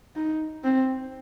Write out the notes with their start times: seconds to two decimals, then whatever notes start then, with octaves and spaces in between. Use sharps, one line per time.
0.16 D#4
0.64 C4